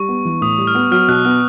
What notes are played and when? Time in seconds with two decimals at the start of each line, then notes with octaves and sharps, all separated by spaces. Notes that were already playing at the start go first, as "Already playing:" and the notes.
Already playing: G3 C#6
0.09 B3
0.25 E3
0.41 A2 D#6
0.58 G3
0.67 F6
0.75 B3
0.91 F#3 F6
1.08 B2 F#6
1.25 B3 F6